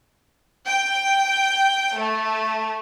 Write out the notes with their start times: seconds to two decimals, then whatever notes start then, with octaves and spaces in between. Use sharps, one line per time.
0.69 G5
1.99 A3